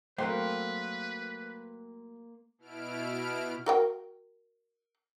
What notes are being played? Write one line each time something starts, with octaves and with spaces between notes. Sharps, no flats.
F#3 A3 A#3 C4 A#4 B4 F5 C6
B2 E4 F6 D7
F#4 A#4 G5